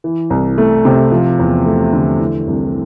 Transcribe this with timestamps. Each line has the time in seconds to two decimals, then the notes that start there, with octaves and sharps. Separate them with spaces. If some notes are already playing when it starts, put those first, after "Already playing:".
0.04 E3
0.30 C2
0.58 A3
0.85 C3
1.12 F3
1.39 E2
1.66 A3
1.93 D3
2.19 E3
2.47 C2